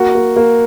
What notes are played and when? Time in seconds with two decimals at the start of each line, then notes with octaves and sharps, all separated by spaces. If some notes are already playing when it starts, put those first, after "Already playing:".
Already playing: A#3 F#4
0.15 A#3
0.36 A#3